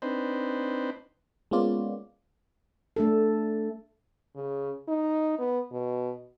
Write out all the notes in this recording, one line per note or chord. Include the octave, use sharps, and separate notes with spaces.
C4 D4 D#4 B4 C5
G#3 A#3 B3 C#4 F4 D5
A3 D4 A4
C#3
D#4
B3
B2